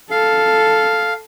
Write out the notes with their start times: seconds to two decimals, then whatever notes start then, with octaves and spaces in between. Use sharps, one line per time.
0.11 A4 F5